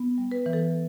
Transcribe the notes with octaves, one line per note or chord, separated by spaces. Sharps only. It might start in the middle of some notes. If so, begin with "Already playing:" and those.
Already playing: B3
G3
B4
E3
A4